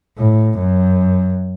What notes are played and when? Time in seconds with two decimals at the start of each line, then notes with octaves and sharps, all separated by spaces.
0.18 A2
0.59 F#2